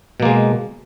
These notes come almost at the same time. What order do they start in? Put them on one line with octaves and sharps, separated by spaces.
B2 A#3 G#3